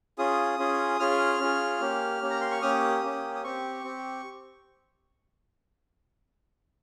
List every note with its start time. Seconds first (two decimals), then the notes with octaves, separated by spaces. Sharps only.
0.18 C#4 F4 G#4 D#6
0.59 C#4 F4 G#4
1.00 C#4 F4 G#4 F6
1.40 C#4 F4 G#4
1.81 A#3 C#4 G4
2.22 A#3 C#4 G4
2.30 A#5
2.41 C6
2.51 C#6
2.62 A#3 C#4 G4 D#6
3.03 A#3 C#4 G4
3.35 D#6
3.43 C4 G4 C#6
3.84 C4 G4